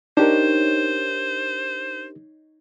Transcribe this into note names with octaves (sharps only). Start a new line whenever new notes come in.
D4 D#4 G4 A#4 C5 C#5